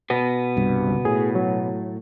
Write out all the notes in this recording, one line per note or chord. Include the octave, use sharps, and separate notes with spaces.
B2 B3
C2 G2
C#2
A2 G#4
F#3